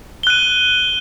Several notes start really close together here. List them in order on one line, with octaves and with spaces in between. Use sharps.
G7 F#6 D#7